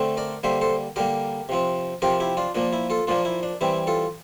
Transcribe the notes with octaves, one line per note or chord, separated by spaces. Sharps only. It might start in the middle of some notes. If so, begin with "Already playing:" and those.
Already playing: D3 A3 C4
A#4 D5
D3 G3 A#3 C5 E5
A4 C5
D3 G3 A#3 G4 A#4
C3 F3 C4
C3 F3 C4 G4 A#4
E4 G4
D4 F4
A#2 F3 A#3 D4
E4
F4 A4
A#2 F3 A#3 D4 F4
E4
D4
E3 G3 C4 E4
F4 A4